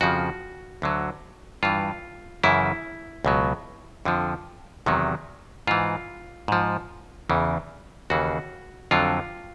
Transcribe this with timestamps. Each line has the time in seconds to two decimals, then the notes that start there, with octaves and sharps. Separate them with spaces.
0.01 F2 C#3 F3 F#4
0.82 D2 D3 F#3
1.63 G2 E3 F4
2.44 F#2 C#3 E3 E4
3.25 C#2 B2 F#3
4.05 F2 D3 F3
4.86 E2 C3 D#3 F#3
5.67 G#2 E3 F4
6.48 G#2 F3
7.30 E2 C#3 E3
8.10 D#2 C#3 E3 F#4
8.91 F2 D3 F#3 F4